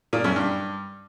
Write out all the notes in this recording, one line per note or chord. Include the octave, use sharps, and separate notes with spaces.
A#2
F#2
G2